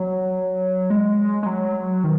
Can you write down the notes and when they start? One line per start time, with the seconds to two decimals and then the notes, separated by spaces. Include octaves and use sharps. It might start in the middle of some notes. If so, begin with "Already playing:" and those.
Already playing: F#3
0.90 G#3
1.43 G#3
1.46 F#3
2.04 D#3